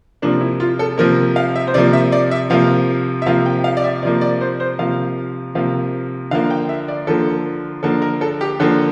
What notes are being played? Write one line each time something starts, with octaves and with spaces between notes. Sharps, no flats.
C3 F3 A#3 D4
E4
F4
A4
C3 F3 A#3 A#4
F5
E5
C5
C3 F3 A#3 D5
E5
D5
E5
C3 F3 A#3 F5
E5
C3 F3 A#3 F5
G5
F5
D5
E5
C3 F3 A#3 D5
D5
C5
C5
C3 F3 A#3 F5
C3 F3 A#3 F5
D3 F3 A#3 F5
G5
E5
D5
D3 F3 A#3 A4
D3 F3 A#3 A4
A#4
A4
G4
D3 F3 A#3 A4